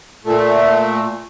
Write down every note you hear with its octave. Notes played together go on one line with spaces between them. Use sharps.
A#2 A3